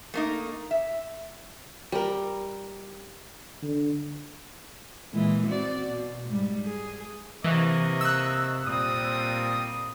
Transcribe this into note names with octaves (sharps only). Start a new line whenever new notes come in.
A3 A#3 D#4
E5
G3 A#4
D3
A#2 E3 G#3
C4 F#4 D5
B2
G#2 G3
G#4
C3 E3 A#3 D#5 C#6
E6 F#6
A#2 G3 C4 D#6